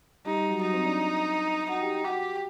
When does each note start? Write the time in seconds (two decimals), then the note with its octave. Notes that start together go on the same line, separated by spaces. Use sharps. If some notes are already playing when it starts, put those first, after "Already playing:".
0.25 G3 D#4 G4
0.37 G3 G4
0.49 F#3 F#4
0.61 F#3 D#4 F#4
0.73 C4 C5
0.85 D4 D5
1.69 D#4 F#4 F#5
1.81 G4 G5
1.93 G4 G5
2.05 F#4 G4 F#5